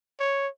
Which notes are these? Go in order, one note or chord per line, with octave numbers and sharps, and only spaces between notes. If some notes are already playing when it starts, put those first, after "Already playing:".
C#5